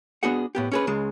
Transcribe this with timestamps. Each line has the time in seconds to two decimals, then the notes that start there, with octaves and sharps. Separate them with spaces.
0.23 B3 D4 F#4 G#4 F#5
0.55 A2 B3 G4
0.72 C#4 G#4 B4
0.87 C#2 C#3 G#3